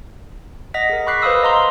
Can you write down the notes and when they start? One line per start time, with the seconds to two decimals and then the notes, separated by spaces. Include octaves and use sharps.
0.74 D#5 F#5 A#6 B6
0.90 G#4 A#4
1.07 B5 C#6 D6 F#6 B6 C7
1.22 B4 C5 F5 B5 D#6 E6
1.43 D#5 A#5 C6
1.56 F6